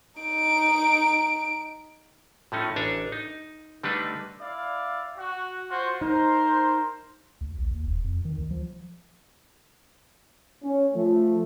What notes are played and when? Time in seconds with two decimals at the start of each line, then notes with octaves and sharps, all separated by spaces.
0.20 D#4 D7
2.52 A2 F3 A3 C#4 D#4
2.76 A1 D4 A4 G#5 A#5
3.12 D#4
3.83 D3 G3 A3 D4 D#4 B4
4.41 E4 D5 F5
5.18 F#4
5.71 F4 F#4 C5
6.01 D#4 A#4 C5
7.41 D2
7.58 A#1
7.71 D#2
7.86 E1
8.04 F2
8.25 D#3
8.38 D2
8.51 F3
10.63 C#4
10.94 F3 A3